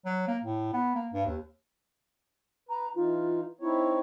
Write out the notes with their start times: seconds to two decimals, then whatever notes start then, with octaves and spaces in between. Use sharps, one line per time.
0.06 F#3
0.28 A#3
0.43 A2
0.73 B3
0.95 A#3
1.13 G2
1.26 D#2
2.69 B4 A#5
2.96 E3 D#4 F4
3.61 C4 D#4 E4 C#5